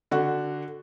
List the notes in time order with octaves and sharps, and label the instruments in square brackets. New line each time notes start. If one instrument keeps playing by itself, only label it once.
[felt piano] D3 F#4